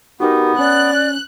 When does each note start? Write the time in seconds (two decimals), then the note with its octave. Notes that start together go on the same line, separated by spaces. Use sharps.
0.20 B3 D#4 F#4 G4 A#4
0.59 C#4 D5 F#6